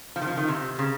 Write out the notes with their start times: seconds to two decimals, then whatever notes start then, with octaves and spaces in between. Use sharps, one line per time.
0.16 F3
0.22 D#3
0.27 F3
0.37 D#3
0.48 C3
0.79 C#3